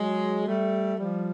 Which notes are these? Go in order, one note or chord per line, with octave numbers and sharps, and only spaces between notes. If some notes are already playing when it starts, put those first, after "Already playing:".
Already playing: F#3 G#3
G3 A3
F3 G3